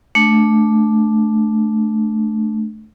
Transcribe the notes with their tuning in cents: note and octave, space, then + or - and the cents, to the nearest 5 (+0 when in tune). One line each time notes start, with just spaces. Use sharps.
A3 -15 D4 +5